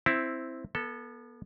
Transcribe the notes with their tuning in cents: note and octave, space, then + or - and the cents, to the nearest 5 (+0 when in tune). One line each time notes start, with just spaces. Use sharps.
C4 +0 E4 +0
B3 -35 A4 +0